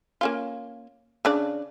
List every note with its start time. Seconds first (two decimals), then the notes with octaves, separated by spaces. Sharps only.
0.21 A#3 C#4 F4
1.25 C#3 D4 D5